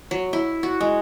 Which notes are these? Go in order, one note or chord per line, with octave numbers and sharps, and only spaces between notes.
F#3
E4
F#4
G#3